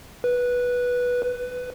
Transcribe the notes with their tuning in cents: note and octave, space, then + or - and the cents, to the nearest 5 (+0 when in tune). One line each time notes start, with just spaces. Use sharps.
B4 -10
B4 +15